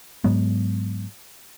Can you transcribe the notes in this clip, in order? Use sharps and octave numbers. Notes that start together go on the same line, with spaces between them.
G#2 F#3 G#3 B3